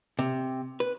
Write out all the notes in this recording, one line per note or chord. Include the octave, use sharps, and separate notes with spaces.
C3
B4